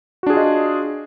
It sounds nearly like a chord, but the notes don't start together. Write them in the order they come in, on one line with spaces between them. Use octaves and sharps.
F#4 D4 G#4 F4 D#5